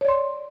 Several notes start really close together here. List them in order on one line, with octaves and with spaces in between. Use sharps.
C#5 D5 C6